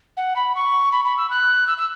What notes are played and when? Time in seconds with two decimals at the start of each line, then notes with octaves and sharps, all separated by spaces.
0.17 F#5
0.36 B5
0.55 C#6
0.92 B5
1.05 B5
1.17 E6
1.31 F#6
1.67 E6
1.78 E6